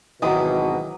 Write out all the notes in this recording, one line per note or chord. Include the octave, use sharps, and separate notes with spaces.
G#1 B2 D#3 E3 F#3 D6 D#6